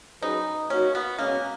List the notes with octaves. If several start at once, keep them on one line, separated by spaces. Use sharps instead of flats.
F#3 C#4 D#4 G#4 B4
A#3 C#4 D#4 F#4 C#5
B3
B2 G#3 A#3 C#4